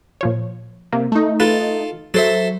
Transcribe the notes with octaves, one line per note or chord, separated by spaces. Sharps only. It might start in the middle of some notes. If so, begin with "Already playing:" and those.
A#2 F3 C#5
C3 A#3
A3 D#4
F4 A4 B4
F#3 A4 C5 E5